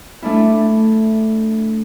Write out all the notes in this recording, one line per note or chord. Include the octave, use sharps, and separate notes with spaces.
A3 D4 E4